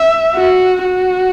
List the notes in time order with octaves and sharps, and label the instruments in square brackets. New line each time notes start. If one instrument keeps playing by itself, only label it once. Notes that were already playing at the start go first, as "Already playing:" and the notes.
Already playing: [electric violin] E5
F#4
F#4